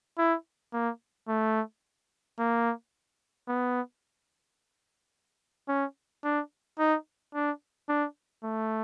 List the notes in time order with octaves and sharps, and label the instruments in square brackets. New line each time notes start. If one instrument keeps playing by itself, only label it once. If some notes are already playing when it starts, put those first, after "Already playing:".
[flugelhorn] E4
A#3
A3
A#3
B3
C#4
D4
D#4
D4
D4
A3